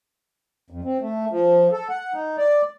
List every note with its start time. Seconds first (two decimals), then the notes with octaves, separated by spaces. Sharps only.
0.70 F2
0.84 C4
1.01 A3
1.30 F3
1.72 A4
1.89 F#5
2.14 D#4
2.38 D5